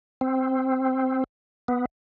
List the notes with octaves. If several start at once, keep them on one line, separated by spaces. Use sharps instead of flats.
C4
B3